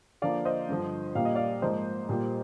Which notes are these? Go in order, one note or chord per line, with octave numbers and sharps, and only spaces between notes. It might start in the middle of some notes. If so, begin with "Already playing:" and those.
D3 F3 A#3 D5 F5
C5 D#5
G2 D3 F3
A#2 G3 A#3 F5
D#5
D5 F5
G#2 F3 A#3 C5 D#5
A#2 G3 A#3